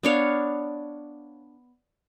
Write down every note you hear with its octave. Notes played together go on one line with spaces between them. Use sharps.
B3 D4 C#5 F5